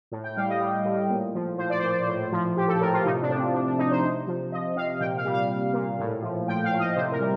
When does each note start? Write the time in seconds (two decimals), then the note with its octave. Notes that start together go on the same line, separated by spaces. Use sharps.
0.12 A2
0.24 G5
0.37 G3 F5
0.49 D#5
0.61 G3
0.85 A2
1.10 A#2
1.34 F3
1.58 F3 C5
1.70 D5
1.80 A#2 C5
1.91 D5
2.02 C5
2.08 A2
2.32 F3
2.56 F3 G4
2.68 A4
2.80 A2 A#4
2.93 F4
3.05 C3 D#4
3.22 D4
3.30 F3
3.38 C4
3.54 F3 D4
3.67 D4
3.78 C3 D#4
3.91 C5
4.03 C3
4.27 F3
4.52 F3 D#5
4.76 C3 F5
5.00 A#2 G5
5.17 F5
5.25 G3
5.34 F5
5.50 G3
5.73 A#2
5.99 A2
6.23 F3
6.48 F3 G5
6.64 F5
6.72 A2
6.79 D#5
6.96 C3 C5
7.12 A#4
7.20 G3